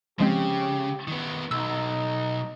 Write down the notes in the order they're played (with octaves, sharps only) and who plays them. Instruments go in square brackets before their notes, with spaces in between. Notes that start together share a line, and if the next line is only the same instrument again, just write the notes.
[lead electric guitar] C#3 [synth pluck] F3 G#3 C4 [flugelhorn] G4
[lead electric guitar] D#3 B3
[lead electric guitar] B1 [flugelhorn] D#4 [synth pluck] E6